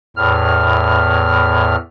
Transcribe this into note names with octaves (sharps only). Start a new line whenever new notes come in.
E2 A2 F6